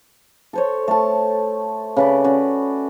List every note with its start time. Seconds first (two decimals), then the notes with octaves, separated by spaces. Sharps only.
0.53 A4 C5 C#5
0.88 A3 A5
1.96 C#3 B4 D5
2.24 C#4 F#4 D5